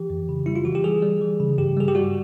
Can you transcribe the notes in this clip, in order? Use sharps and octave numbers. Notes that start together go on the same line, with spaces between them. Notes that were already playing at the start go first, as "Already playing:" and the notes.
Already playing: E3 G4
F2
C#3
G3 E4
F4
E3 F#4
G4
G3 G#4
G3
E3
C#3
G2 G4
G3 G#4
G4
G3 F#4